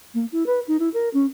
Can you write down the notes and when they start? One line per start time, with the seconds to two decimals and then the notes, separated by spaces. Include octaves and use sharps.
0.14 A#3
0.32 E4
0.46 B4
0.68 D#4
0.79 E4
0.94 A#4
1.13 C#4